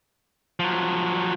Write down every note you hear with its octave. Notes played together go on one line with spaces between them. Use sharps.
F3 F#3